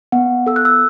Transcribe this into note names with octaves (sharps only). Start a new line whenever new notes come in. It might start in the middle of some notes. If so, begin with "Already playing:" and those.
B3 F#5
A4 E6
F#6
E6